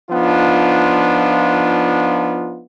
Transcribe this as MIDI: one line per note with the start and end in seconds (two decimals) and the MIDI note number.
0.11 2.64 53
0.11 2.64 59
0.11 2.64 62
0.11 2.64 63
0.11 2.64 65